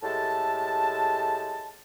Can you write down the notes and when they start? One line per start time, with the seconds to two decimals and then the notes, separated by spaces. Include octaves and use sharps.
0.03 A2 G#3 G4 A4 E5 A5